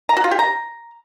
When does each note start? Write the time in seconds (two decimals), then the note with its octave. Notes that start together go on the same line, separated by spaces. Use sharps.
0.09 A#5
0.17 F#4
0.24 F4
0.31 G4
0.39 A#5